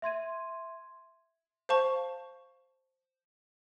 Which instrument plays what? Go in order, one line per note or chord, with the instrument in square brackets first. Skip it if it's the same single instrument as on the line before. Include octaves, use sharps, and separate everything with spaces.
[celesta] E5 C6 G#6 D#7
[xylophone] C5 F5 A5 C#6